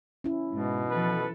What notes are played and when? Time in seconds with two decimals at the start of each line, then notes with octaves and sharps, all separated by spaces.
0.24 C#4 E4
0.52 G#2 B2
0.91 E3 F3 A4 B4